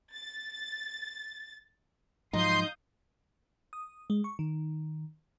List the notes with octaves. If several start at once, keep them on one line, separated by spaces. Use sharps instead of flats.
A6
G#2 F3 F#3 D#4 F5 C6 D#6 G6
D#6
G#3
C#6
D#3